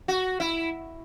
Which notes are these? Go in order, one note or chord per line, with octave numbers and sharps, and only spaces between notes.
F#4
E4